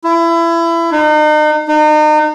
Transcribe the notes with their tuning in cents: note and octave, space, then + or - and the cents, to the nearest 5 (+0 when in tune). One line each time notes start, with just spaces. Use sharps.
E4 +25
D#4 -40
D#4 -35